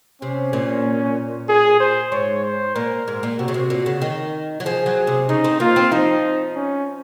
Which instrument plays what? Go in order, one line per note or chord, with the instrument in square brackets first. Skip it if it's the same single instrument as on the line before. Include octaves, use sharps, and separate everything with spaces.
[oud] C3 [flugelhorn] C#4
[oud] A#2
[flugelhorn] G#4
C5
[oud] G#2 [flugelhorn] C#5
[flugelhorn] C5
[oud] A#2 [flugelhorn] A#4
[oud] G#2
A#2
[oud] C3 [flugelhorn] F#4
[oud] C#3
C3
A#2
C#3
D#3
F#3
[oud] F3 [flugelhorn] G#4
[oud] F#3
C3
[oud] C#3 [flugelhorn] D#4
[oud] C4
[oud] A#3 [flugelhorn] F4
[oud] C4
[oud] F3 [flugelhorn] D#4
[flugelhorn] C#4